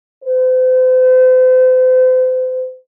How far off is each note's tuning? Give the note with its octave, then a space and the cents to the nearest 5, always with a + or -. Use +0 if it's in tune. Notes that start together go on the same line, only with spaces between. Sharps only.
C5 -40